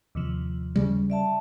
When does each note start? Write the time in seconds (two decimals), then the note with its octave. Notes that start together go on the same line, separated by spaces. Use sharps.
0.15 D#2 C3 F3
0.76 C#3 G3
1.10 D5 E5 A5